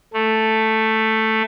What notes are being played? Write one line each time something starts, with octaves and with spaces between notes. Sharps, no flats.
A3